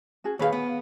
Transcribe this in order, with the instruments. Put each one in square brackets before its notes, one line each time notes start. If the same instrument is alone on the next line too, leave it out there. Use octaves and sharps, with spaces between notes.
[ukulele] C#4 F#4 G#4
[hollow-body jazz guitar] D#2 F5 [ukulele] G#4 B4 C#5
[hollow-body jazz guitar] B3